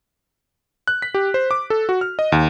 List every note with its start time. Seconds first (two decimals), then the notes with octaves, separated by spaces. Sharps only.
0.88 F#6
1.02 B6
1.14 G4
1.34 C5
1.51 D6
1.70 A4
1.89 F#4
2.01 F6
2.19 D#5
2.32 D#2